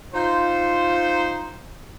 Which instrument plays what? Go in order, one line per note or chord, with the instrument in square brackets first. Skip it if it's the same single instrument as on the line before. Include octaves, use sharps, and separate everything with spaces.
[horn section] D#4 F4 C5